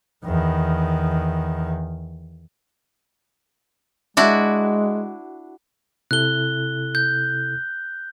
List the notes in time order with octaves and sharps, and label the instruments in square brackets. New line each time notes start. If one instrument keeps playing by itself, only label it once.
[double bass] E2 D#3
[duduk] G#3 [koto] D4 E4 F#4
[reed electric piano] C3 E4 A4 [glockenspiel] F#6 G7
[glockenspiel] G6